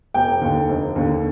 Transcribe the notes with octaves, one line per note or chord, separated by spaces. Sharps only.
F1 G5
D#2 D3
F1
D#2 D3